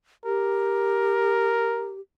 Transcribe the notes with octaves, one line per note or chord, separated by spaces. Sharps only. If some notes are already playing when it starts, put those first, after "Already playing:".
G4 A#4